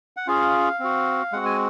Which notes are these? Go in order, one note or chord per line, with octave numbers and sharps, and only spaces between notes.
F#5
C#4 F4 G#4 F5
C4 F#4
G#3 C4 F#4 F#5
G#5